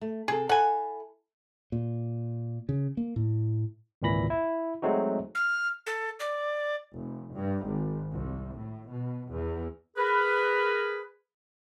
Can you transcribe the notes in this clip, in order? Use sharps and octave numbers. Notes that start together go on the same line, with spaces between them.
A3
C3 G#4 A4
E4 A4 F5 F#5 G#5
A#2
C#3
A#3
A2
G#1 C#2 A#2 E3 B5 A#6
E4
F#3 G#3 A3 C4 D#4 F#4
F6
A4
D5
F1
G2
G#1
C2
A2
B2
E2
G#4 A#4 B4